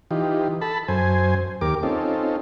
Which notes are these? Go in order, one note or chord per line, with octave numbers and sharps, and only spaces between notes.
E3 D#4 F4 G4
A4 A5 B5
F#2 C5 G#5
D#2 G4 A#4 D6
C4 C#4 D#4 F4 A4